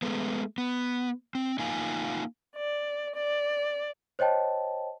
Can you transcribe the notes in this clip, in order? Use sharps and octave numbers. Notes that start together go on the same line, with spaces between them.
G#3 A3 B3
B3
C4
A#3 D#4 F4 F5 G#5
D5
D5
C5 C#5 D#5 G5 A5